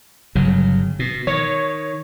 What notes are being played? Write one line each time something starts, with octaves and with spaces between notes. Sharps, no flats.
G1 C#3 F#3
B2
D#3 C#5